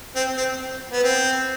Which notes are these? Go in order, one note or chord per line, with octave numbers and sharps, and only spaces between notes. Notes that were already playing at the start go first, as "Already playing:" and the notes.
C4
C4
B3
C4